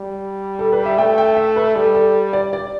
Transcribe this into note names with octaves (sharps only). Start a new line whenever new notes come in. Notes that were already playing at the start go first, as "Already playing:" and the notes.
Already playing: G3
A4
B4
E5
A3 G5
G5
E5
B4
G3 A4
A4
D5
D5